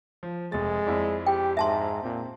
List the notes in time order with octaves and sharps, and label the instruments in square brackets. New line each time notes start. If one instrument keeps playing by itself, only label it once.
[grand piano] F3
[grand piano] F1 A6 [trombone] G#3
[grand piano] F2 E4 D5
[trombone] G4 [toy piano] G5
[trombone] G#2 [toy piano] E5 A5 C6
[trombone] A#2 [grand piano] C4